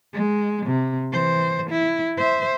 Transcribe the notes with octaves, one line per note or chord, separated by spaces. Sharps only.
G#3
C3
E3 C5
E4
C5 E5